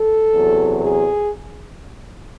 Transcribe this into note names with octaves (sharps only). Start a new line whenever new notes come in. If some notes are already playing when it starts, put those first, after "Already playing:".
Already playing: A4
E2 C3 F#3
G#4